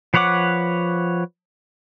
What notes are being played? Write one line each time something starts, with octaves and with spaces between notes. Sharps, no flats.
F3 B4 C#5 F#5 D6